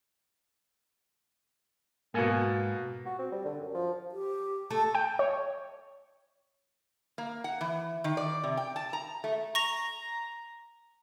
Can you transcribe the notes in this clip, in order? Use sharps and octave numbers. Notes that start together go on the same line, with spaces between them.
G#2 B2 A#3 A4 G#5
F#4
C4
G3
D3
F#2
F3
G4
A3 A4
G5
C#5
A#3
F#5
E3
D#3
D5
C3
G5
A5
A#5
A3
A#5 C#6 A#6 F7